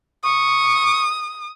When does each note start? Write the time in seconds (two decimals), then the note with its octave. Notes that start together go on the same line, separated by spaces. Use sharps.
0.24 C#6 D#6